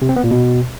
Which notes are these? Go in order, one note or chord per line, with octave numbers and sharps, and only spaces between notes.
C3
C4
B3
A#2
B2